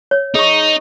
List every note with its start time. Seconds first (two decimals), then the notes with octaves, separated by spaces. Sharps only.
0.11 C#5
0.35 D#4 G#4 C#6